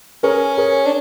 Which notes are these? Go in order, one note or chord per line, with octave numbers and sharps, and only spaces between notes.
C#4 G#4 A#4
G#4 A#4
D4